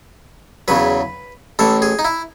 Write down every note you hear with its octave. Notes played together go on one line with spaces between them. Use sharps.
E2 C#3 F#3 B4
A1 A2 E3 A4
G#4
D#4
E4